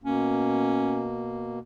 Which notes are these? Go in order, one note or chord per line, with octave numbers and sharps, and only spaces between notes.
B2 A#3 C#4